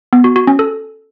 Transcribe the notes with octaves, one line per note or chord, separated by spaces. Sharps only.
B3
F#4
F#4
C#4
A4